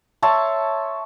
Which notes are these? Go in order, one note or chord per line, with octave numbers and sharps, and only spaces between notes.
C#5 E5 A5 C6